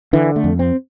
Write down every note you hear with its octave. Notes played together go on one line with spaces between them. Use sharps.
D3 E3
A3
F2
C4